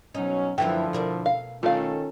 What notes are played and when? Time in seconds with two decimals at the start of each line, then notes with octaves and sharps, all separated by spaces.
0.15 B2 F#3 C#4 D#4
0.58 F#2 D3 E3 F3 A3 E4 G5
0.93 B2 A#4 D5
1.26 F5
1.63 D#3 A3 C#4 F4 A4 F5